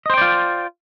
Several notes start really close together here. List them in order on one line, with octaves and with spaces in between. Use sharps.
D#5 C5 G5 D5 F4